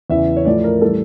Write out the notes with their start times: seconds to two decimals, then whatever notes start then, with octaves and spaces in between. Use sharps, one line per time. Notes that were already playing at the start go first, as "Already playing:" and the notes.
0.10 E2 C#3 E3 E5
0.37 C#5
0.45 A2 F3 A3 D5
0.64 A#4
0.82 A2 E3 G3 A4